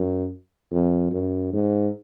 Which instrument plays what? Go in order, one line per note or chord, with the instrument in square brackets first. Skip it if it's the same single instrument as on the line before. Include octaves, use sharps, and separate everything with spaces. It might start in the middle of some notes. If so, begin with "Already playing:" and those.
Already playing: [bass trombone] F#2
F2
F#2
G#2